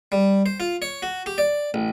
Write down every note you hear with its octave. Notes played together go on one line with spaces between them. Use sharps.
G3
C5
F4
C#5
F#4
G4
D5
A1